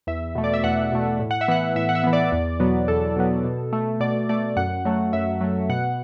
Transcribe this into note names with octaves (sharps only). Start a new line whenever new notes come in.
E2 E5
B2 A3
D5
E5
E2 F#5
B2 A3
A2
F#5
E5
E3 B3 F#5
A2 E5
F#5
E5
E3 B3
D5
E2
B2 F#3 B3
E2 A4
B2 F#3 B3
B2
A3
B2 D5
A3 D5
F#2 F#5
F#3 A3
F#2 E5
F#3 A3
B2 F#5